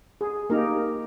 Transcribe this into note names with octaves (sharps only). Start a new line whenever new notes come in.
G#4
A#3 D#4 G4 A#4